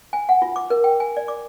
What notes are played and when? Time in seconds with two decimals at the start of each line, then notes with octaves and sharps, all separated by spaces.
0.13 G#5
0.29 F#5
0.42 F4
0.56 D6
0.70 A#4
0.84 G5
1.00 G#5
1.17 D5
1.28 D6